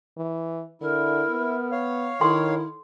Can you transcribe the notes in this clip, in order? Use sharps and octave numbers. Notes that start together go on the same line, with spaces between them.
E3
D3 E4 A#4
B3
C#5 F5
D#3 E4 A4 F#5 C6